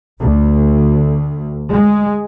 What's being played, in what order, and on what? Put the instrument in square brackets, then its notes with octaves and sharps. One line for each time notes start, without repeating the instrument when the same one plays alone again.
[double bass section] D2
G#3